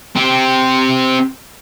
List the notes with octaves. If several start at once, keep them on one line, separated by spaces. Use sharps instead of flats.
C4 G4